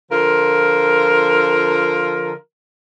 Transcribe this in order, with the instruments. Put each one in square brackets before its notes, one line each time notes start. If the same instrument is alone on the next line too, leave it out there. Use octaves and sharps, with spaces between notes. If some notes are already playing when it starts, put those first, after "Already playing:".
[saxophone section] D3 F3 F4 A#4